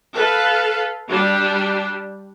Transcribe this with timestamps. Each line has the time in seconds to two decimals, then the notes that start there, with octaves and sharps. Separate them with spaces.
0.15 A4 B4 F5
1.09 G3 D4 G4